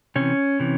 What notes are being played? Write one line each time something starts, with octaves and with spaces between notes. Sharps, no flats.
C3 E3 C#4
C3 E3